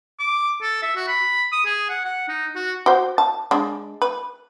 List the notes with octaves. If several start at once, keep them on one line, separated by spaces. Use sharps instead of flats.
D6
A4
E5
F#4
B5
D#6
G#4
F#5
F#5
D#4
F#4
F#4 C5
A5
G#3 D4
B4